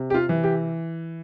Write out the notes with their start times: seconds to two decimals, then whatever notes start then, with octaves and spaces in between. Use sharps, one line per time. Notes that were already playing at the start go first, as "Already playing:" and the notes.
Already playing: C3
0.10 G4
0.14 F4
0.29 E3
0.44 G4